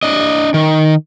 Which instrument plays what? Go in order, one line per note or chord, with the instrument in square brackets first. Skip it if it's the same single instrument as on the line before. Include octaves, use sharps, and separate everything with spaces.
[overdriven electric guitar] D4 D#5
D#3